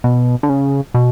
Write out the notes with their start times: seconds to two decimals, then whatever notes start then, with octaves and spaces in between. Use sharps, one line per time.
0.04 B2
0.43 D3
0.49 C#3
0.94 B2